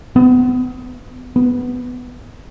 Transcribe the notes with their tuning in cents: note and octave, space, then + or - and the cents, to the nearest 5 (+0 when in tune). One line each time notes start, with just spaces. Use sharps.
B3 +25
B3 +5